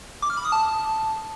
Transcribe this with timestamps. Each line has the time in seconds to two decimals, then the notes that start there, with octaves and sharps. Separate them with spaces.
0.22 D6
0.30 F6
0.37 B5
0.45 D#6
0.52 A5